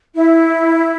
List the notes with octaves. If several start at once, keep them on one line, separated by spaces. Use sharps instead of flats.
E4